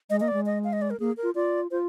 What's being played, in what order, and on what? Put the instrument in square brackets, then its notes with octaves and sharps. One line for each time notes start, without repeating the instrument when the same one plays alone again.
[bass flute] G#3 [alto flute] D#5
[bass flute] A#3 [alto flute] D#5
[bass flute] G#3 [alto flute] D5
[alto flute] D#5
F5
D#5
D5
A#4
[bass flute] A#3 [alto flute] G#4
[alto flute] A#4
[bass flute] F4
[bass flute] F4 [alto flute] D5
[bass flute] F4 [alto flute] C5